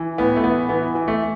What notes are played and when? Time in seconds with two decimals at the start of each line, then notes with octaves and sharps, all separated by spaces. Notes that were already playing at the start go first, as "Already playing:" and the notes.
Already playing: E3
0.18 A2 B3
0.36 A3
0.44 E3 B3
0.69 E3 B3
0.95 E3
1.08 A3